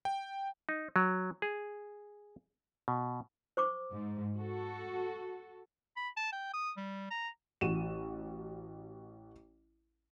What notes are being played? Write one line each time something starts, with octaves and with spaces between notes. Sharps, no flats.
G5
D#4
F#3
G#4
B2
C5 C#6 D6
G#2
F#4 A4
B5
A5
G5
D#6
G3
A#5
A1 F#4 D#7 E7